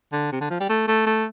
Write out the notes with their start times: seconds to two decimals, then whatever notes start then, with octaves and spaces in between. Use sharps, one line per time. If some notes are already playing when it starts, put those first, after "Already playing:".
0.12 D3
0.32 C3
0.41 D3
0.50 F3
0.60 G3
0.70 A3
0.88 A3
1.06 A3